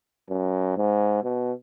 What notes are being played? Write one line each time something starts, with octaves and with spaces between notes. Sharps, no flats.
F#2
G#2
B2